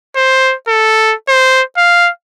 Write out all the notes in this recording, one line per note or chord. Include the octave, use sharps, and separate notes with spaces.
C5
A4
C5
F5